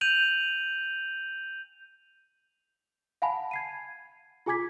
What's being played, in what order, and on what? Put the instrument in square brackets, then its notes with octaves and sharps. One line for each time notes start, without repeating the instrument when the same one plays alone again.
[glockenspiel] G6 D#7 F7 F#7
[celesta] F5 F#5 G#5 A5 B5
G#6 C7 D#7
F4 G#4 G#5 D6 G#6 B6